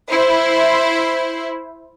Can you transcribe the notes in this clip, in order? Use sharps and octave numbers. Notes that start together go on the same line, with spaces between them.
E4 C5